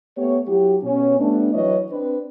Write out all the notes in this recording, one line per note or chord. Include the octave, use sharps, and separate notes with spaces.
A3 B3 G4 C#5
F#3 E4 F#4 G4
B2 C#4
G3 A3 B3 D4
E3 F#3 E4 B4 C#5 D#5
C4 D4 B4